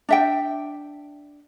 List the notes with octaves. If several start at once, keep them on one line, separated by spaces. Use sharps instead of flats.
D4 E5 G5